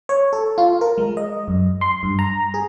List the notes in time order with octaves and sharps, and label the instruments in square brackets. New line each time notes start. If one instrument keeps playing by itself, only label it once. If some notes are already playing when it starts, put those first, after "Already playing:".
[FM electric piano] C#5
A4
F4
A#4
G#3
D#5
F#2
C6
G2
A#5
G#4